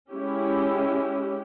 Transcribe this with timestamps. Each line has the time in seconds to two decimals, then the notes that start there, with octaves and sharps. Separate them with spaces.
0.12 G#3 C#4 E4 G4